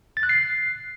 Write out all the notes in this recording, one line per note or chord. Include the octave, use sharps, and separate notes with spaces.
A6
F#6
C7